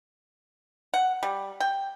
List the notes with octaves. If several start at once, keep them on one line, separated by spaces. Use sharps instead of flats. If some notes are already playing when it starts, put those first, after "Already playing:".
F#5
G3
G5